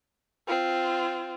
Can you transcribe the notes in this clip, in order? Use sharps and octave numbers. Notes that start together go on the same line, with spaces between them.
C4 F4